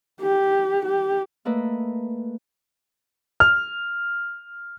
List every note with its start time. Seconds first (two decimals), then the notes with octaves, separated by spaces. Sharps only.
0.22 G4
0.85 G4
1.45 A3 A#3 A4 B4 D#5
3.40 F6